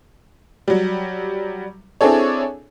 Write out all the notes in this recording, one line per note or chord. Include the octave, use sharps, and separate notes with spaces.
F#3 G3
C4 D4 E4 G#4 A4 C#5